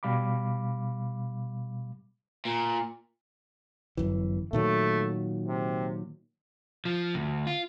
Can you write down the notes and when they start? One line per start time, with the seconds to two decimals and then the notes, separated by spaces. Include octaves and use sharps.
0.03 B2 G3 F5 B5 D6
2.45 A#2
3.97 G1 F#2 E3
4.53 A#2 D#3 F#3 A3
5.47 C3
6.85 F3
7.15 D2
7.47 F4